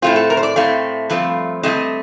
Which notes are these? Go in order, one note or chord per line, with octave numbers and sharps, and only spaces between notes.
A2 A3 C4 F4
A4
A#4
C5
D5
A2 A3 C4 F5
G2 F3 A3 C4
G2 F3 A3 C4 D#5